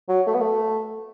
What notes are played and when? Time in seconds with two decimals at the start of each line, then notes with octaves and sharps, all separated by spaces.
0.09 F#3
0.27 A3
0.34 B3
0.41 A3